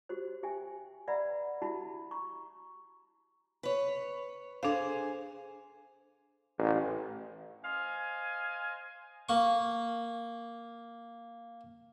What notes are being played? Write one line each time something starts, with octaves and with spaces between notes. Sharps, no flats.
F#4 G4 C5
G4 E5 G5 G#5
B4 D5 E5 F#5 A#5 B5
E4 F#4 G4 E5 A5 B5
A#5 C#6
B4 C#5
D4 G#4 A4 C5 F5
A1
C5 D#5 F5 G#5
A#3 C#6